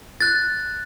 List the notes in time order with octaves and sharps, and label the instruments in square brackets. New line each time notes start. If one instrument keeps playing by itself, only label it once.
[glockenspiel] F#6 A6